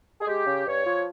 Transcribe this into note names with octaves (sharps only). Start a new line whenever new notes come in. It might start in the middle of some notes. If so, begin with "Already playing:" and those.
G#4
G#3 G4
C#3
G2 C#5
F3